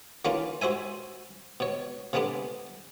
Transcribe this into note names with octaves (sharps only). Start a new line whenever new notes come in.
E3 A#3 C#4 D4 F4
F#4 C5 E5 G#5
B2 C#5
C3 G#3 A3 B3 D4